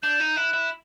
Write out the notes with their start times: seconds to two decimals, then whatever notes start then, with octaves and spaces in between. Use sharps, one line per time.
0.03 D4 G6
0.20 D#4
0.37 E4 F#6
0.54 E4